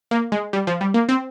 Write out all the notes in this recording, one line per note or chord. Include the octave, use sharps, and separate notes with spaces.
A#3
G#3
G3
F3
G3
A#3
C4